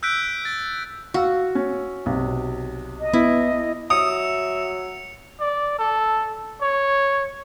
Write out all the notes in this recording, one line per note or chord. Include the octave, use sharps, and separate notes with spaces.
E6 F#6 G6 B6 D7
A6
F#4 F5 E6
C#4
B1 C3
D#5
B3 E4
F#3 E5 D#6 C#7 D7 F7
D5
A4
C#5